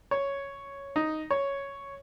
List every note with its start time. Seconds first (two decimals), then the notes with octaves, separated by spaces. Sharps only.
0.11 C#5
0.96 D#4
1.31 C#5